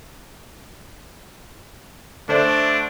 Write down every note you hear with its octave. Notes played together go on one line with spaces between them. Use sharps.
D3 A3 D4 C5 D5